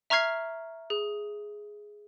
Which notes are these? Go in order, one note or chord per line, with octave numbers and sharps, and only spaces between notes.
E5 A#5 C#6 F6 G#6 C7
G#4